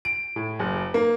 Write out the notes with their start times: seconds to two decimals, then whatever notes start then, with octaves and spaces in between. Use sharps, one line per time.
0.05 D7
0.36 A2
0.59 F#1
0.94 A#3